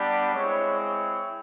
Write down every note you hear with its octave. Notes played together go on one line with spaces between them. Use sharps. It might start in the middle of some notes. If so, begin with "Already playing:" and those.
Already playing: G3 B3 D4 G4 D5
G#3 C4 E4 C#5
C#5